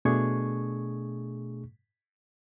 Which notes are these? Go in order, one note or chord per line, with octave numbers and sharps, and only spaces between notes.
B2 A3 D4 G#4 C#6 G#6